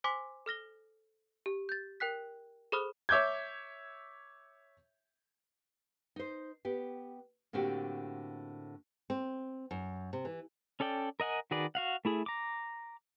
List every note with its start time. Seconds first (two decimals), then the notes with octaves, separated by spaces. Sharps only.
0.04 C5 G#5 C6 D6 B6
0.46 A4 F6 A#6 G7
1.46 G4
1.69 G6 A6
2.00 A#4 G5 F#6 B6
2.72 G#4 A4 C5 B5 D#6 F6
3.09 C#5 E5 D6 G6 G#6
6.16 D#4 C5
6.65 B3 G4
7.53 A2 D3 A#3 C4 F#4 G4
9.10 C4
9.71 F#2
10.13 C3
10.25 E3
10.80 C#4 A4 D5 G5
11.20 A#4 D#5 F#5 G#5
11.51 D#3 F#4 G#4 B4 D5
11.75 F#4 F5 F#5
12.05 A3 E4 G#4
12.26 A#5 D6